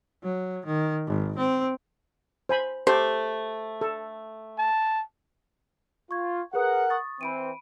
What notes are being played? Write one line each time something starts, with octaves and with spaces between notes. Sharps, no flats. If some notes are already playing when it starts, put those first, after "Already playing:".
F#3
D#3
G#1
C4
C5 G#5 B5
A3 G4 C5
A4
A5
F4 C#6 G#6
G#4 A#4 B4 F#5 D#6
C#6 D#6 A6
E3 C4 B5 D7 D#7